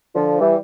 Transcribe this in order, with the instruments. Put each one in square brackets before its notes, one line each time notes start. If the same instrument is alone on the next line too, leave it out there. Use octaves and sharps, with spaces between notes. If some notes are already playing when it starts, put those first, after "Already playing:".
[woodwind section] D3 F3
E3 G3